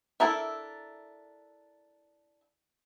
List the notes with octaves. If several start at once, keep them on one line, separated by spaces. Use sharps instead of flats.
D4 E4 A4 A#4 E5